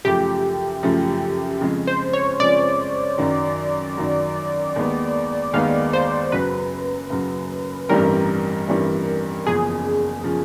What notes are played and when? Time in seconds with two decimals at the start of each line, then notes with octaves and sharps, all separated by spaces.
0.04 F#2 C#3 F3 A3 G4
0.83 F#2 C#3 F3 A3
1.61 F2 C#3 F3 G#3
1.87 C5
2.13 C#5
2.39 F2 C#3 F3 G#3 D5
3.18 F#2 D#3 F#3
3.97 F#2 D#3 F#3
4.76 D#2 D#3 G#3 B3
5.53 D#2 D#3 G#3 B3 F5
5.93 C5
6.32 F#2 C#3 F#3 B4
7.10 F#2 C#3 F#3
7.89 A1 G2 E3 G3 C4 A#4
8.67 A1 G2 E3 G3 C4
9.46 F#1 E2 C#3 F3 G#4
10.24 C#3 F3